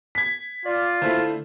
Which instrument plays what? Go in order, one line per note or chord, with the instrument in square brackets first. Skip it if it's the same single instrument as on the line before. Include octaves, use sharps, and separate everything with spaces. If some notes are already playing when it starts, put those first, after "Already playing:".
[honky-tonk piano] G#6 B6
[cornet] F4 [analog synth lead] D5
[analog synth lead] D3 [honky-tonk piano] A3 E4 C5